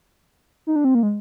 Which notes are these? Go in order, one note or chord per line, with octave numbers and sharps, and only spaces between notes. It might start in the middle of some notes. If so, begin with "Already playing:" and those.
D#4
D4
C4
A#3
G#3